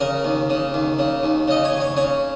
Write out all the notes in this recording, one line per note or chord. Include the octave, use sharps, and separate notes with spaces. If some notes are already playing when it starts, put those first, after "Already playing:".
C#3 A#4
D#2
C#3
D#2
C#3
D#2
C#3 D#5
C#5
D#2
C#5
C#3 C#5